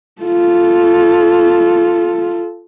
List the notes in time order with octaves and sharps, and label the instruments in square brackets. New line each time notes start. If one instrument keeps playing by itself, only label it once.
[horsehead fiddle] F4 A4